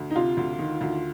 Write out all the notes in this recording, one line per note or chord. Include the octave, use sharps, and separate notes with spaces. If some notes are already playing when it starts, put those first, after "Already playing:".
Already playing: D2
D#4
C3 F4
D2
D#3
D2